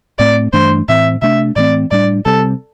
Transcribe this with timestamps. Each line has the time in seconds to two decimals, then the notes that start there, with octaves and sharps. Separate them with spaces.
0.19 A2 A3 C4 D5
0.53 G2 E3 A3 D4 C5
0.88 A2 E3 C4 E5
1.22 C3 A3 D4 E5
1.56 A2 E3 A3 C4 D5
1.91 A2 G3 D4 D5
2.25 C3 G3 C4 A4